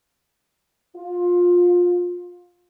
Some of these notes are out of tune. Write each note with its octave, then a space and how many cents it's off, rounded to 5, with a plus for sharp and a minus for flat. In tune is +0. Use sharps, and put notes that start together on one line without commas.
F4 +20